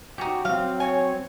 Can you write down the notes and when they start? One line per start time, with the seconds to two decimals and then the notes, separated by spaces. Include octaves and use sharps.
0.18 C#4 D#4 F#4 G4
0.45 F#3 C4 F5
0.80 C#5 G#5